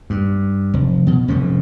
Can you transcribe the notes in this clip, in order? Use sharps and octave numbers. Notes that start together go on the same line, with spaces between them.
G2
F1
B2
F1 F2 G#2 C#4